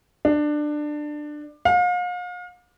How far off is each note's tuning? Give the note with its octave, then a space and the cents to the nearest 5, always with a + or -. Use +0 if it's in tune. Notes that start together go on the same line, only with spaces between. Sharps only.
D4 +20
F5 +40